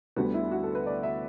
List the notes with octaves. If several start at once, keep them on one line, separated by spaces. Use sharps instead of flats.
D2 D3 G3 B3 F#4
E4
F#4
A4
B4
D5
E5